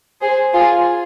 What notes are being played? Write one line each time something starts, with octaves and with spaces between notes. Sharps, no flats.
G#4 C5
F4 G#4